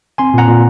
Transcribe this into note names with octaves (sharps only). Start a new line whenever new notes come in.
C4 G#5 C6
A#2 F#5 A#5
A#2